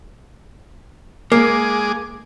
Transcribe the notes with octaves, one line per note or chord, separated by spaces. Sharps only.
G#3 A#3 G#4 D6